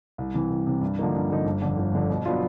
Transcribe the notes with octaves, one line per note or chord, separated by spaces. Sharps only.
C2
C3 E3
C2
C3 E3
G2
D3 F3 A#3 D#4
G2
D3 F3 A#3 D#4
G1
F2 D3
G1
F2 D3
B2
F#3 B3 D4 F4